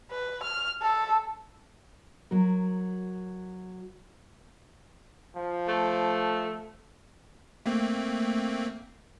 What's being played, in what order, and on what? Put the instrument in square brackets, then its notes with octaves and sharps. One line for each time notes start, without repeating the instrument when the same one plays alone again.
[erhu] B4
F6
A4
[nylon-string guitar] F#3 F#4 A#4
[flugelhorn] F3
[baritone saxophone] A3
[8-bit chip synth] A3 A#3 C4